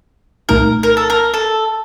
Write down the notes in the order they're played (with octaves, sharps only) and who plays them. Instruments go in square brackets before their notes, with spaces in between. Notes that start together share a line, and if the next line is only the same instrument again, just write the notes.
[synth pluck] C2 A#2 A3 D#4 [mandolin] A#4
[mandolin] A#4
A4
A#4
A4